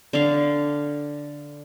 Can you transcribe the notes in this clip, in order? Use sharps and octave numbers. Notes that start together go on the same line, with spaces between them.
D3 F5